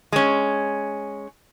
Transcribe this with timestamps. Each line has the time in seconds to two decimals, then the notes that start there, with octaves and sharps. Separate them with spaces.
0.12 G#3 C#4